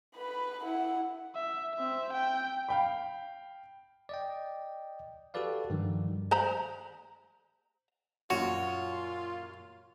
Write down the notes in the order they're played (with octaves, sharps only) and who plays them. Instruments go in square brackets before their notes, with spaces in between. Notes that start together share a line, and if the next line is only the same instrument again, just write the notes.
[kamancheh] B4 B5
E4 F#5
[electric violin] E5
C4 E5
G5
[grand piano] F5 G5 B5
[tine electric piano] D5 D#5 G5
F#4 G4 A4 B4 D5 F5
G2 D#3 F3 G3
[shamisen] C5 A#5 B5
[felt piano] F#2 A#2 [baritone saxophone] F4 [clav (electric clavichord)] F#4 [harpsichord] C#5